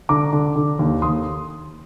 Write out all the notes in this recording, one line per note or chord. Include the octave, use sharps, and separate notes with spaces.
D3 A#5 D6
D3
D3
D#2
D#2 C6 D#6